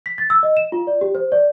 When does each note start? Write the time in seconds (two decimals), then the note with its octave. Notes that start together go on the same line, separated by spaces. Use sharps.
0.06 B6
0.18 A6
0.30 E6
0.43 D#5
0.57 E7
0.72 F4
0.87 D5
1.01 G4
1.15 C5
1.32 D5